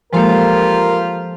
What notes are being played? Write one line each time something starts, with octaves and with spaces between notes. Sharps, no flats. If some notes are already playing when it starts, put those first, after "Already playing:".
F3 G#3 A#3 F4 G4 A4 A#4